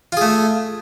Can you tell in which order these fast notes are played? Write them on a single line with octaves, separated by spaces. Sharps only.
F4 G#4 A3